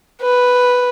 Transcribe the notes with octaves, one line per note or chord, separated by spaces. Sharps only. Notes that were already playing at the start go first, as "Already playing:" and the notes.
B4